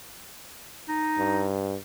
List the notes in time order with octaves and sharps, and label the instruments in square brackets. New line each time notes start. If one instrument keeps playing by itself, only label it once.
[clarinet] D#4
[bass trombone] G2